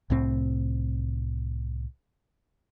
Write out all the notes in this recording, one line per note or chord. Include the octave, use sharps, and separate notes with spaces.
C2 A2 C4